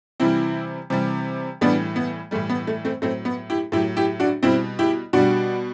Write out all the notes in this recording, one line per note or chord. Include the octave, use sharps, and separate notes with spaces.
C3 E3 G3 C4 E4
C3 E3 G3
A2 E3 G3 B3 D4
B3
A2 E3 G3 A3
B3
A3
A3 C4
A2 F#3 A3 C4
B3
E4 G4
A2 F#3 E4 G4
E4 G4
D4 F#4
B2 G3 C4 E4
E4 G4
B2 G3 D4 F#4